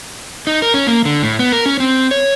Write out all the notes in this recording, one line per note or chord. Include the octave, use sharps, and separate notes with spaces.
D#4
A#4
C#4
A#3
D3
A2
B3
A#4
C#4
C4
C#5